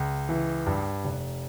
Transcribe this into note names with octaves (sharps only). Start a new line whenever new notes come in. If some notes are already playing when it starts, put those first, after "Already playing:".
Already playing: C#2
E3
G2
F1